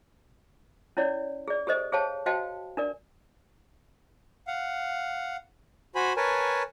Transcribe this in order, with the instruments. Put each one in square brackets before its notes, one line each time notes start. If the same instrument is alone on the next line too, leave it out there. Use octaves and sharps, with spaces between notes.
[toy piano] C#4 E4 C#5 D5
G#4 D5
G4 A4 C5 D#5
G#4 C5 C#5 F5 G5 A5
F#4 C5 D#5 F5 G5 A5
D4 A#4 D5
[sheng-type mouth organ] F5 F#5
F#4 C5 G#5 B5
A#4 B4 C#5 G#5 A5